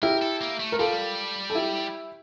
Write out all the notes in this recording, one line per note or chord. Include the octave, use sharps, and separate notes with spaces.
E4 G4 A#4
A4
A#3
A3
A#4
G3 F4 A4
A4
E4 G4